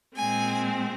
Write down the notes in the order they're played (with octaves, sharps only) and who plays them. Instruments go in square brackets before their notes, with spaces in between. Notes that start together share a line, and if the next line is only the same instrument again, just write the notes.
[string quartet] A#2 G#3 C4 G#5